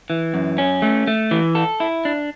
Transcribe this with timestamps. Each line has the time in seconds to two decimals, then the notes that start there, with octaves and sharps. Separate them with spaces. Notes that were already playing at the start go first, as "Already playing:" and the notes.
0.10 E3
0.34 F#2
0.58 C#4
0.82 A3
1.07 A3
1.31 E3
1.55 A4
1.80 E4
2.05 D4